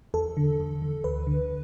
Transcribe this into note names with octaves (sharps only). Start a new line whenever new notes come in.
E2 A4
D3
E2
D3
D2 B4
D3